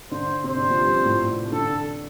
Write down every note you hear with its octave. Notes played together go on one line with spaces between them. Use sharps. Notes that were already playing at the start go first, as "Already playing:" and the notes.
D3 C5
C3 C5
D3
F3
G2 G3
C4
A2 A3
C3 C4
D3 D4 A4